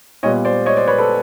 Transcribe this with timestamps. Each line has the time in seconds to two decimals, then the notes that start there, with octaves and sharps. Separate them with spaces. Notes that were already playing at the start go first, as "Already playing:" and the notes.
0.23 A#2 G3 B3 C#5 D#5
0.45 C5 D5
0.66 C#5 D#5
0.77 C5 D5
0.87 B4 C#5
0.98 A4 B4